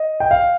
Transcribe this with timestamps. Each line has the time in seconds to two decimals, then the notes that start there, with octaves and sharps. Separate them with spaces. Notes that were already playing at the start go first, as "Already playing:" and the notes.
Already playing: D#5
0.20 G5
0.31 F5